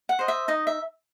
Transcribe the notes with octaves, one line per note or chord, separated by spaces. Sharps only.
F#5
C5 D#5
E5
D#4 D#5
E5